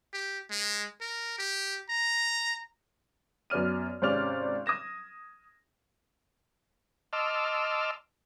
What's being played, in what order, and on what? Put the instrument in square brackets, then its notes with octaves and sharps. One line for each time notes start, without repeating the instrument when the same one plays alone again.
[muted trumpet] G4
G#3
A#4
G4
A#5
[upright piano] F#2 B3 D5 F6 D#7
G#1 C3 C#4 D5 F6 F7
D#6 G#6 A#6 E7
[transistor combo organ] D#5 A5 C6 D6 E6 F6